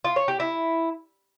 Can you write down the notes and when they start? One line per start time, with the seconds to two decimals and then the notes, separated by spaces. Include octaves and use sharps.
0.05 F4
0.16 C#5
0.28 G4
0.40 E4